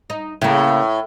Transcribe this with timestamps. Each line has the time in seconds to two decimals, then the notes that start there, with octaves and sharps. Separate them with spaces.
0.10 D#4
0.42 A2 C#3 A#3